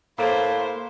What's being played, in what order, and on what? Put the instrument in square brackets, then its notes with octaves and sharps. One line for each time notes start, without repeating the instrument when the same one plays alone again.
[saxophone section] A2 A3 [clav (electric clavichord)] A#3 [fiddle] C5 [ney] F5